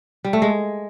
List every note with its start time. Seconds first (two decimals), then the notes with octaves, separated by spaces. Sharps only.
0.24 G3
0.33 A3
0.42 G#3